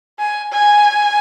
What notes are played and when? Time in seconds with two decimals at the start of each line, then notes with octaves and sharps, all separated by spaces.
0.19 G#5
0.52 G#5